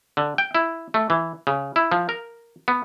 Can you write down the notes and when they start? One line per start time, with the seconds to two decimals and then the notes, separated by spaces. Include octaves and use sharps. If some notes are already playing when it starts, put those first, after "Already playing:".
0.17 D3
0.38 G5
0.55 E4
0.94 A3
1.10 E3
1.47 C#3
1.76 E4
1.92 F3
2.09 A#4
2.68 B3